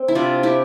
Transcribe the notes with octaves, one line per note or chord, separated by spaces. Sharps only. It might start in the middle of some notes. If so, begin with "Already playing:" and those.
Already playing: C4
E4
C3 D4 F4
E4 G4